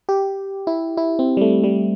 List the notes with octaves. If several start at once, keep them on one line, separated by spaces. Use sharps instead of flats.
G4
E4
E4
C4
G3
A3
G3